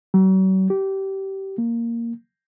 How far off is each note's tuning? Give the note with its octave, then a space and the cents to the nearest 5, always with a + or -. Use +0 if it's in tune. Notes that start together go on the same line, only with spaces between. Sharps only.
F#3 +40
G4 -20
A#3 -5